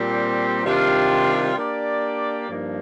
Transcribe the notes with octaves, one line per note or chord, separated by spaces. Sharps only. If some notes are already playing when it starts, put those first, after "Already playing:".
Already playing: A#2 G3 C4
C3 D#3 G3 D4 F4
A#3 D4 G4 D5
G2 F3 A#3 D#4